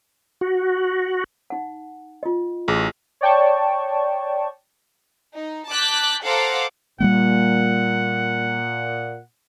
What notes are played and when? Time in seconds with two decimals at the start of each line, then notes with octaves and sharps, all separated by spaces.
0.41 F#4
1.50 D#4 F#5
2.23 F4 D#5
2.68 A1 G#4 D6
3.21 C#5 D5 G5 A5 C#6
5.35 D#4
5.69 A5 D6 F#6 G6 B6
6.24 A4 C5 F5 F#5 A#5 D6
7.00 A#2 G3 G#3 A#3 F#5